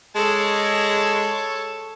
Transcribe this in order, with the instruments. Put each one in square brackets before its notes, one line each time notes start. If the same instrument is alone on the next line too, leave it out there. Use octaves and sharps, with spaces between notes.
[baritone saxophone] G#3 [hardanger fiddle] A4 C#5